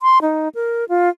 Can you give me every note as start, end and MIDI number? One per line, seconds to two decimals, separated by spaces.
0.02 0.19 84
0.22 0.48 63
0.55 0.85 70
0.89 1.09 65